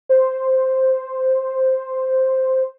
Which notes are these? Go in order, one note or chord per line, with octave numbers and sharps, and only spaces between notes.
C5